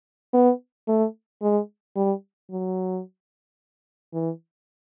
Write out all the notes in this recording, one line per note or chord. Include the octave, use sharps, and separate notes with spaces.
B3
A3
G#3
G3
F#3
E3